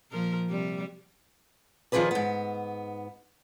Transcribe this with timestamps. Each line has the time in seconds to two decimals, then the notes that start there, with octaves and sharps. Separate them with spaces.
0.12 A#2 F3 A#4
0.50 C3 G3
1.92 D#3 F3 F4 G#4 B4 D5
2.11 G#2 B3